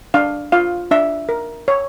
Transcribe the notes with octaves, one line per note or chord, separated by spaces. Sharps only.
D4 F5
F4 F5
D4 E5
A#4
C#5